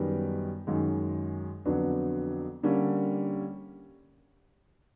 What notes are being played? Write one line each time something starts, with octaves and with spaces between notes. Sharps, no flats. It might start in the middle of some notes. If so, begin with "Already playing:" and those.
Already playing: F#2 D#3 G3 B3
F#2 D#3 G#3
F2 D3 F#3 B3 D4
D3 G3 A#3 C#4